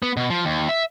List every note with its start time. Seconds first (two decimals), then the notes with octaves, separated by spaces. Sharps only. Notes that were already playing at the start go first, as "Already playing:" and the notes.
0.03 B3
0.17 B2
0.30 F3
0.45 D#2
0.69 E5